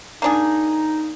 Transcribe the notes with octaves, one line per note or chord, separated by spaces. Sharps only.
A#3 D4 D#4 G#4